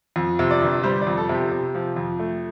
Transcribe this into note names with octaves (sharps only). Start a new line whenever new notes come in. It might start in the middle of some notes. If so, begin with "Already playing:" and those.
F2
C3
D5
G1
G3 C5
D5
F2
A4
C3
G4
C3
F3
F2
A3